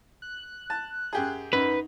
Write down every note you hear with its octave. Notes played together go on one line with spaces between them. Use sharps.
F#6
A5
F#2 G4 G#4
F#2 D#4 B4